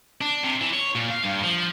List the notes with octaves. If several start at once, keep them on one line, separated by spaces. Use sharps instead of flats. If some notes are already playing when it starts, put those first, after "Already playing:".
D4
C3
E3
C#5
A#2
F5
G2
F3